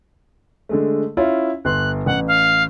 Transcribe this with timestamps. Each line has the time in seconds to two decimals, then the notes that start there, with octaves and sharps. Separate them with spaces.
0.69 D3 G#3 A3
1.17 C#4 E4 F4
1.65 G1 C6 F#6
2.06 A1 F#5
2.27 F5